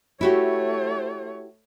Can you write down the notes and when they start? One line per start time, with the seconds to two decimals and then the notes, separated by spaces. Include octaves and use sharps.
0.21 A3 E4 F#4 G4 C#5